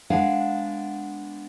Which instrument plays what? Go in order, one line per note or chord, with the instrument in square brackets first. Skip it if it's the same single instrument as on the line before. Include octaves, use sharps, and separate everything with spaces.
[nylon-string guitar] G#3 B3 D4 A#4 F5 F#5